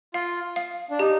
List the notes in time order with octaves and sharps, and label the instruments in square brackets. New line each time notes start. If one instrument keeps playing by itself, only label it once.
[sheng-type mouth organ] F4 [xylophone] F5
[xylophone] F5
[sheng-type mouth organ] D4
[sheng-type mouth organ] D#4 [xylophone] G4